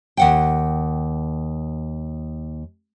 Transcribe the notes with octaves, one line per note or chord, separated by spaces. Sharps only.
D#2 F#5 G5